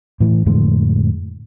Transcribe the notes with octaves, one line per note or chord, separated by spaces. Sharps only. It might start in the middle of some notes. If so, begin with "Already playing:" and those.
A2 E3
F2 A2 D3 G#3